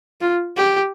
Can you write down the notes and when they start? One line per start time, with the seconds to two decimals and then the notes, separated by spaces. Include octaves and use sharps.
0.21 F4
0.57 G4